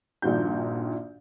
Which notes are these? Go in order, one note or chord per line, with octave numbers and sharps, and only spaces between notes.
A#1 G2 A#2 D#3 F#4 G6